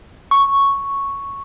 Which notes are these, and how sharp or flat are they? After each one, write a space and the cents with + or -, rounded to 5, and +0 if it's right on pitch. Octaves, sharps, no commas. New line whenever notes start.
C#6 +0